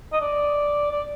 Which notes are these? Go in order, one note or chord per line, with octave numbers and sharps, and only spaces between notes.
D#5
D5
D5